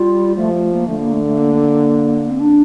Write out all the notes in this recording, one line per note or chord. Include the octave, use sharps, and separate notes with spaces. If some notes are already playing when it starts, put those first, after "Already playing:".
Already playing: G3 F4
F3 A3
A3
A#3
D3 A3
A#3
A3
A3
A#3
C4
D4